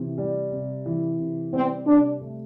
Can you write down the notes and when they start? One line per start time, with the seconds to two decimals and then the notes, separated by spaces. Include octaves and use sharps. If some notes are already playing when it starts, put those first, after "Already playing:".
Already playing: C3 E3
0.18 G3
0.51 C3
0.86 E3
1.19 C3
1.53 G3 C4
1.87 C3 D4
2.21 A3